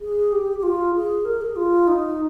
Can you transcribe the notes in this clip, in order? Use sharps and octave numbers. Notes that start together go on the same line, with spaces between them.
G#4
G4
G4
F4
G#4
A#4
G#4
F4
D#4